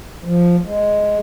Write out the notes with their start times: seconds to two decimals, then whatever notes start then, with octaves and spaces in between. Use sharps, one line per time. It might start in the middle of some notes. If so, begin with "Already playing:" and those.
0.24 F3
0.65 G#3